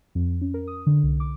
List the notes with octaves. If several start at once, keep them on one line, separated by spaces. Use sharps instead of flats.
F2
C#4
A#4
D#6
D3
C2
D6